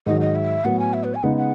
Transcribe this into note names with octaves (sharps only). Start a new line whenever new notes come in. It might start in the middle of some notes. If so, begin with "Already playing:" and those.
G#2 D#3 F#3 D#5
D#5
E5
A2 F#3 B3 F#5
G#5
E5
B4
G#5
C#3 G#3 B3 D#4 F#5
F#5